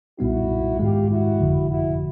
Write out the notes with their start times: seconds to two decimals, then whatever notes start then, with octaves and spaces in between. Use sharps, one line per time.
0.18 B1 A#2 G3 B3 D#4 E4 F#4
0.79 G#2 D#3 G#3 F4 G4
1.09 E4 F#4
1.39 G1 F2 D3 F3
1.69 E4 F#4